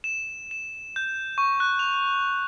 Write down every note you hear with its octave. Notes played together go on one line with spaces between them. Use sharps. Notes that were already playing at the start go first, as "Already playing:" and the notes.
E7
E7
G6
C#6
F#6
F7